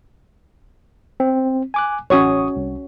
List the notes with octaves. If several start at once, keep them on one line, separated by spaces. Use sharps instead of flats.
C4
G#5 D6 F#6
A1 C#4 F#4 C#5 C#6 D#6
C2